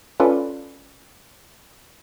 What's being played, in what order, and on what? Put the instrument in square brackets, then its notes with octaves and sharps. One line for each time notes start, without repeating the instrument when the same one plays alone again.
[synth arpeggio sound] C#4 F4 A4 B4 D5